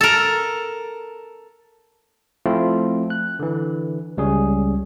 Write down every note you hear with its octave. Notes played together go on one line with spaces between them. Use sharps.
A4 A#4
F3 A3 C4 E4 F4
F#6
D3 E3
C#2 G3 C#4 G#4